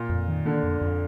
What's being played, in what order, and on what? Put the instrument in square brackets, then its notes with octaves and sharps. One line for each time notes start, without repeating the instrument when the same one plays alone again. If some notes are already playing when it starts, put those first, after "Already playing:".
Already playing: [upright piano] A#2
[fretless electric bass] F2
D#3
[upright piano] D3 [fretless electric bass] A#3
[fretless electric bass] F2
F2